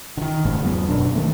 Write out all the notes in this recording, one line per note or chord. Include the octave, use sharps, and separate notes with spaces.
D3 D#3
G1 G#2 C#3 A3
E2 F#3 B3
G1 F#2 B2 D4
D#3 A3